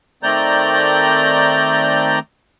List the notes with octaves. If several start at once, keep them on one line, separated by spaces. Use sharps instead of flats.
D#3 A3 C4 D5 A#5 G6